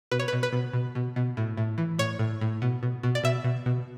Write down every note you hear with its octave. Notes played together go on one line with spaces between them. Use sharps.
B2 B4
C#5
B2 B4
B4
B2
B2
B2
B2
A2
A2
E3
A2 C#5
A2
A2
B2
B2
B2
D5
B2 E5
B2
B2